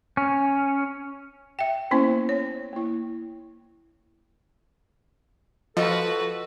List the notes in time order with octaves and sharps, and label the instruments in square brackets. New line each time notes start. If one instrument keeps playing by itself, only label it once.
[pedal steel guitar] C#4
[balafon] E5 G5
A#3 B3 C#4 E4 C5
C#5
A#3 E4
[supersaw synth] F3 [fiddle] F#4 B4 [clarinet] A4 [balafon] D#5